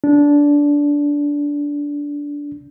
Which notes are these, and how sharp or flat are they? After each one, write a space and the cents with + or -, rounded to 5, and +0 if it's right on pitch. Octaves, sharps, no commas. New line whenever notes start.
D4 -15